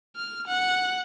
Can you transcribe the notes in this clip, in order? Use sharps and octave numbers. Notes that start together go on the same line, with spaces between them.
F6
F#5